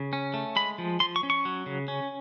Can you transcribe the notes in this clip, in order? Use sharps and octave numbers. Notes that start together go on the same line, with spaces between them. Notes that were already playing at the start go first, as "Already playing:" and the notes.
Already playing: C#3
C#4
A3
G#3 B5
F3
F3 C6
C#6
C#4
C#6
F#3
C#3
C#4